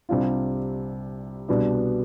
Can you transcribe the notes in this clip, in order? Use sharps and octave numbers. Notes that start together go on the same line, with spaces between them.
C2 C3 G3 D4 F4
C2 B2 B3 D4